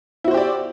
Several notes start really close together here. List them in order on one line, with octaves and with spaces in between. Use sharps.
E4 F#4 C5 G4 D5